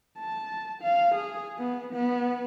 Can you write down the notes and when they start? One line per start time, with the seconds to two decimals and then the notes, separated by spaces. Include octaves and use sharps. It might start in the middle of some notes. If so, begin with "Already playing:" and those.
0.19 A5
0.82 F5
1.15 G#4
1.58 B3
1.93 B3